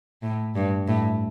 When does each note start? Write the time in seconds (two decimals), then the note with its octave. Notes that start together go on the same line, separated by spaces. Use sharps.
0.22 A2
0.55 G2
0.88 A2